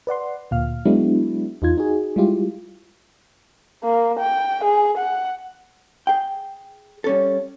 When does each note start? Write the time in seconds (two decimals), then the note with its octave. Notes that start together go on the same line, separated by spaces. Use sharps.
0.07 B4 D5 F#5 C6
0.51 D2 A#2 F5 F6
0.85 F#3 G#3 B3 D4 E4 F#4
1.62 E2 D#4 F4 G#6
1.77 D#4 F#4 G#4
2.16 G3 G#3 E4 F4 G4
3.83 A#3
4.19 G5
4.64 G#4
4.98 F#5
6.07 G#4 G5
7.04 G3 C#4 A4